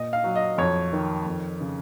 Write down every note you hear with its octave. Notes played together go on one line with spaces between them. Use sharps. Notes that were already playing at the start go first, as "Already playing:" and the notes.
Already playing: A#2 D#5
F5
F#3
D#5
F2 C#5
D#3
F2
C#3